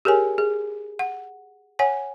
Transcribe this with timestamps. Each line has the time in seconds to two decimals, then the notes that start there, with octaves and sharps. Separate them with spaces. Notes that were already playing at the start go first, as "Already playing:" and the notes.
0.05 G4 G#4 A#4 C#5 G#5
0.38 G#4
0.99 F#5
1.79 C#5 F#5 G#5